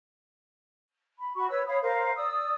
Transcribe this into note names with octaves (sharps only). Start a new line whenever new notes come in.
B5
F#4 B5 C#6
B4 C#5 E6
C#5 F5 B5 D#6
A#4 C5 F5
D5 D#6 E6